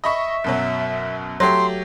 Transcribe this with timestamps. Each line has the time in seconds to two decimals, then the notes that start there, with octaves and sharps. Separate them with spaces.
0.04 D#5 E5 B5 C#6
0.44 F#2 B2 F#3
1.40 F#3 A3 G4 C6